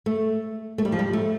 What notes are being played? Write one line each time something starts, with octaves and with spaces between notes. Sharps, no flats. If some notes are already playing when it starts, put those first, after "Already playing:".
A3
A3
G3
F3
G3
A3